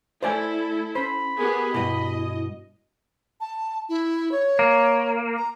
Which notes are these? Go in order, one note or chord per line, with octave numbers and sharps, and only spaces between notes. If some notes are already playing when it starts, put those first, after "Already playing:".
A3 E4 A4 C5 D5 G#5
C#4 C5 B5
B3 G4 G#4 A#4
G2 B2 E4 D#5
A5
E4
C#5
A#3
A#5